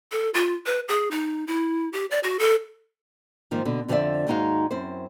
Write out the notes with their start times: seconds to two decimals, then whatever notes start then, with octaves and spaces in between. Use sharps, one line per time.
0.12 A4
0.34 F4
0.66 B4
0.88 G#4
1.11 D#4
1.47 E4
1.93 G4
2.11 D5
2.23 F#4
2.39 A4
3.51 G#2 D#3 F3 A#3
3.65 B2 D3
3.88 F2 D3 F3 G4 D5 E5
4.27 D#2 G#2 G#3 D#4 F#4 F5
4.71 F#2 C4 E4 C5